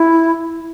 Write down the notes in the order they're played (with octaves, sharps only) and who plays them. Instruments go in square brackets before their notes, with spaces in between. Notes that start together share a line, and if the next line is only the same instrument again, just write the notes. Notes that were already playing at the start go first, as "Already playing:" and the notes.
Already playing: [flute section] E4